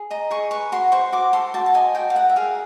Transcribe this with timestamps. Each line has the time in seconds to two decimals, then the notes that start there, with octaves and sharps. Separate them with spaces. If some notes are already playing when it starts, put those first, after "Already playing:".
Already playing: G#4
0.10 D#5 A#5
0.31 G#4 C#6
0.51 B4 C#6
0.72 F#4 C6
0.92 C5 C#6
1.12 F#4 D6
1.33 A4 C6
1.54 F#4 A5
1.66 A5
1.74 D#5 G#5
1.95 F#4 G5
2.10 F5
2.15 A#4 F#5
2.30 E5
2.36 G#4 F5